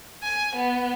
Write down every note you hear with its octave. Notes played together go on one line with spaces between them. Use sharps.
G#5
B3